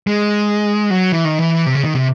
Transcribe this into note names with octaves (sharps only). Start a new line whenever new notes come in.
G#3
F#3
E3
D#3
E3
C3
C#3
D#3
C3